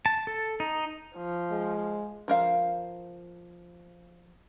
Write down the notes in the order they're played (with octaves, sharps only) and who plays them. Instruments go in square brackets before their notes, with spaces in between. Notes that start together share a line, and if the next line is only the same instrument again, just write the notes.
[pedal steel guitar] A5
A4
D#4
[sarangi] F3
[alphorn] G#3
[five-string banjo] F3 A#4 F5